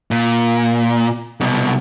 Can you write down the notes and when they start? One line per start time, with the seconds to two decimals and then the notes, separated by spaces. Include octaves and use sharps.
0.11 A#2
1.40 C2 B2